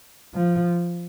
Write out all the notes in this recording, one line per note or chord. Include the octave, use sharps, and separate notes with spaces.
F3